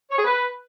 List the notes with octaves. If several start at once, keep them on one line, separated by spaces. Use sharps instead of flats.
C#5
G#4
B4